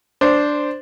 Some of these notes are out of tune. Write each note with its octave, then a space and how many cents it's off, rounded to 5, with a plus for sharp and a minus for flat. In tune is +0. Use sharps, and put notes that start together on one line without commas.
D4 +0 C5 -5